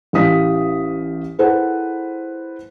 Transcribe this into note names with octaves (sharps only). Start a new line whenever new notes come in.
A1 E3 G4 F5 D#6 B6
E4 G#4 A4 B4 C5 F#5